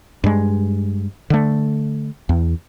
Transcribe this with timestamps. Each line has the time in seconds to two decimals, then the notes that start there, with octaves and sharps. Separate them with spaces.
0.24 G2 G#3
1.30 D3 A3
2.29 E2